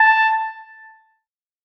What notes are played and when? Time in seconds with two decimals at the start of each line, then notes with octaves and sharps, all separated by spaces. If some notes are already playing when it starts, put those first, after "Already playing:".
Already playing: A5